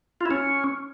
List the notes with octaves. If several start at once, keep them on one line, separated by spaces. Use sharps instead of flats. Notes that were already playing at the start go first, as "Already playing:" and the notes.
F4
E4
C#4